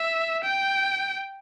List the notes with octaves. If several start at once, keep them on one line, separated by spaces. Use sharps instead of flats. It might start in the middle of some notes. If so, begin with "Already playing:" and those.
Already playing: E5
G5